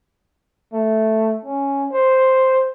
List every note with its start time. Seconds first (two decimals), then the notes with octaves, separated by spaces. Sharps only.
0.73 A3
1.45 C#4
1.92 C5